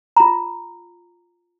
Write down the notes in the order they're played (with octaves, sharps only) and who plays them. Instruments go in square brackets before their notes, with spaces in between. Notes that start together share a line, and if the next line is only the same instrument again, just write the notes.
[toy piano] F4 A#5